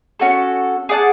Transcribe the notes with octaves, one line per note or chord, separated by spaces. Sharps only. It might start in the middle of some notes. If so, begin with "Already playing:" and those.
C#4 F#4 A4
G#4 D5 F#5 A5